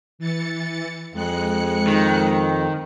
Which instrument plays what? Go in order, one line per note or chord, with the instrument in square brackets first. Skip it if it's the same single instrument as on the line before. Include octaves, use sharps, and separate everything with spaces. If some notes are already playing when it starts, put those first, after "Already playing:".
[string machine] E3 A6 C#7
[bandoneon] F2 [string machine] G#3 F#6 C#7
[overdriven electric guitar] D#3